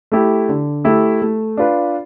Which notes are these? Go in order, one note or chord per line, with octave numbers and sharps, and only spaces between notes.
A3 E4 G4
D3
A3 E4 G4
A3
D4 F4 B4